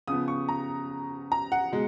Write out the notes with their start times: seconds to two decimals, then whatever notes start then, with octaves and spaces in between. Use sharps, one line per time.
0.08 C#3 F3 B3 D#6
0.28 C#6
0.49 A#5
1.32 A#5
1.52 F#5
1.72 B2 G#3